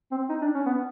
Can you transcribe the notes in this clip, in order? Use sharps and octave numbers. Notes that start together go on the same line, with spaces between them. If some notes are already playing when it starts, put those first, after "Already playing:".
C4
D#4
D4
C#4
B3